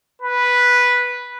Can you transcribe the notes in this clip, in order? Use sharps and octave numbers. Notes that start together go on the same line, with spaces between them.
B4